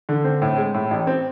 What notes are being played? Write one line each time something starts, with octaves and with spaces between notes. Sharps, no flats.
D3
C4
A2
G#3
A2
A1
C4